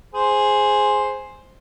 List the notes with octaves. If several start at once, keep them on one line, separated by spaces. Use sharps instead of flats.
G#4 C5